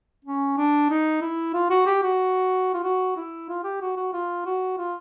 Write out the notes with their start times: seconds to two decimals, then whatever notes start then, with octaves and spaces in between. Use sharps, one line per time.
0.25 C#4
0.57 D4
0.90 D#4
1.22 E4
1.54 F4
1.70 F#4
1.86 G4
2.03 F#4
2.74 F4
2.84 F#4
3.17 E4
3.49 F4
3.64 G4
3.81 F#4
3.97 F#4
4.13 F4
4.46 F#4
4.78 F4